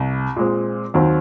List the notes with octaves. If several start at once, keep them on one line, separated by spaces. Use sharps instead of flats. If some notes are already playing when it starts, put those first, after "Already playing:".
Already playing: C2
A#2 G#3 C4
D#2 D#3 F#3 C4